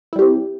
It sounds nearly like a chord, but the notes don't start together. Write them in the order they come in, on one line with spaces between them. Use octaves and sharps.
E4 G3 G4 C4